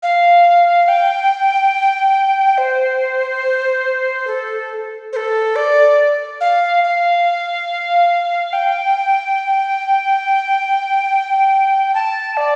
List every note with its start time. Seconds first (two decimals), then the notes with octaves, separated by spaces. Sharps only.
0.03 F5
0.88 G5
2.58 C5
4.27 A4
5.13 C5
5.16 A4
5.56 D5
6.41 F5
6.84 F5
8.53 G5
11.94 A5
12.37 D5